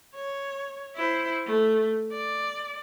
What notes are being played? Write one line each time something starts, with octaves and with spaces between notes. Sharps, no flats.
C#5
E4 C5
A3
D5